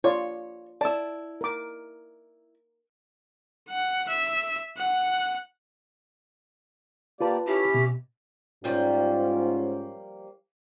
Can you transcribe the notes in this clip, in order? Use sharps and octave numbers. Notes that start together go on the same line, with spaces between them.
F4 C#5 D5 C6
E4 D5 A5 E6
A#4 D6
F#5
E5
F#5
A#3 F4 G4 B4 D5 A5
C#4 E4 G4
B2
G#2 F3 G3 A#3 C#4 F4